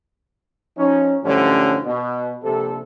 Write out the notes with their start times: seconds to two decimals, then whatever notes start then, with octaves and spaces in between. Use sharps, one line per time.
0.77 F3 C#4 D#4
1.23 F#2 A2 D3 F3 G3 C#4
1.83 B2
2.43 A#1 C3 A4